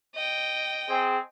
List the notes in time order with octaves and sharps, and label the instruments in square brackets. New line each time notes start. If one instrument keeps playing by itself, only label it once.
[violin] D#5 G5
[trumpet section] C4 G#4